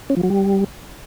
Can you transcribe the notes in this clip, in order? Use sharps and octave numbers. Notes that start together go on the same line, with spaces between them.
C#4
F3
F#3
G3